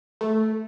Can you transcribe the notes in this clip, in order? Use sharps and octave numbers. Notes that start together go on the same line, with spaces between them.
A3